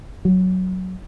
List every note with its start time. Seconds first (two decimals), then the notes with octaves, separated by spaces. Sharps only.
0.25 F#3